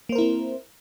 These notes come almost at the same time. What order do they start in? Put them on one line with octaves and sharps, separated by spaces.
A#3 C5 A#4 E4 C4